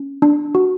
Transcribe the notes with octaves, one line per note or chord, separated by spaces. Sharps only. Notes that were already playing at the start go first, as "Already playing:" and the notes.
Already playing: C#4
D4
F#4